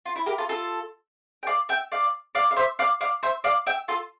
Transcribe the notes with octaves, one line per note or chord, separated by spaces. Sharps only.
F4
E4
G4 A#4
F4 A4
F4 A4
G5
D5 F5
E5 G5
D5 F5
D5 F5
F5
C5 E5
D5 F5
D5 F5
C5 E5
D5 F5
E5 G5
F4 A4